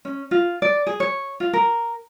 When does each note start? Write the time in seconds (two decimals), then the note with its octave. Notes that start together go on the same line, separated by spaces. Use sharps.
0.05 C#4
0.31 F4
0.62 D5
0.87 G#4
1.00 C#5
1.40 F4
1.53 A#4